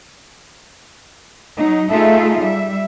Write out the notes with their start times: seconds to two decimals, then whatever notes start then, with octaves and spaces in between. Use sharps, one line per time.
1.57 F#3 D#4
1.89 A3 D#4 F4 G#4 A4 E5
2.38 G3 E5